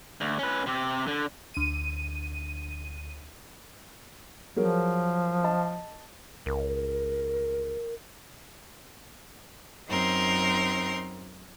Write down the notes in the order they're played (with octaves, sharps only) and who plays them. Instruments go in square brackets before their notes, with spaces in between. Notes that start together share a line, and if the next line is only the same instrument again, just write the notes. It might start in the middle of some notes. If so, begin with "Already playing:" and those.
[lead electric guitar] D2
C#4 B4
C3 G4
D3
[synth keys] D2 D#7
[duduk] F3 [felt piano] F#3 G#4 A#4
[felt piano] D#5 A5
[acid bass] C#2 [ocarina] A#4
[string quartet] F#2 C4 D#4 A#4 C6